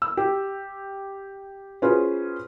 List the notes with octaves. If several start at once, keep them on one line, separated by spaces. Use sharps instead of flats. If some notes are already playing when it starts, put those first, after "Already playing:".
E6
G4
C#4 F4 F#4 G#4 B4 C5